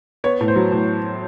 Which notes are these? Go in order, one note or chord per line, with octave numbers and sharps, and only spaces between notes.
B3 C#5
A2
C5
F#3
A2